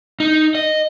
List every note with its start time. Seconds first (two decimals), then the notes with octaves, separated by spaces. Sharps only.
0.20 D#4
0.55 D#5